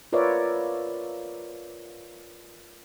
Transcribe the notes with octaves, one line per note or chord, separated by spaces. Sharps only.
F4 A#4 B4 C#5 D5 E5